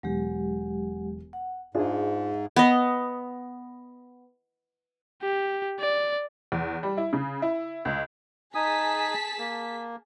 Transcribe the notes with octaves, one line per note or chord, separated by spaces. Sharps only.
E1 F#3 G#3 G4
F#5
G#2 D4 F4 G#4 E5
B3 D#5
G4
D5
E2
G3
E4
C#3
E4
C#2
D#4 G#4 G#5 A5 D#6 B6
A#3